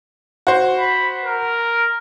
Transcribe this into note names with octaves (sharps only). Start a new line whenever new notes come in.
F#4 C5
B5
A#4